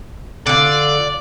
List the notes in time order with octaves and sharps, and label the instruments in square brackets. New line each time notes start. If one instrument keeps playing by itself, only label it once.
[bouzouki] D3 F4 [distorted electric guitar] D5